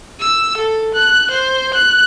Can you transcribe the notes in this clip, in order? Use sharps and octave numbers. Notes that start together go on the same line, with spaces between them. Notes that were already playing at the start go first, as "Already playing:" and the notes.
E6
A4
F#6
C5
F#6